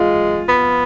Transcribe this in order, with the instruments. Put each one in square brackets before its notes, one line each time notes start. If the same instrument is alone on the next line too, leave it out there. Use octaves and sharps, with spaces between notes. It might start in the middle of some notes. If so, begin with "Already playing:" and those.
Already playing: [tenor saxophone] G#3 [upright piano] F4
[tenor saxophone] B3